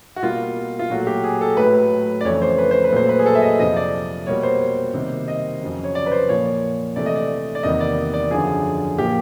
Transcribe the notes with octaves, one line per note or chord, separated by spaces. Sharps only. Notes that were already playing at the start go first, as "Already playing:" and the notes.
F#4
B2 G3 A#3 F4
F4
A#2 F#3 A3 F#4
G4
G#4
A4
A2 F#3 A3 B4
D5
F2 C#3 E3 A3 C#5
C5
B4
C5
B4
A#2 F#3 A3 C5
B4
G#4
A4
E5
D#5
F2 C3 F3 D#5
D5
B2 G3 A#3 C#5
C5
C3 D#3 G3 A#3
D#5
F2 C#3 F#3
C#5
D5
B4
C5
A#2 F3 A#3 C#5
C3 E3 A3 D5
D#5
D5
D5
E2 C3 D#3 G3 A#3 D#5
D5
D5
F#2 D3 F3 G#4
A#2 F3 A#3 G4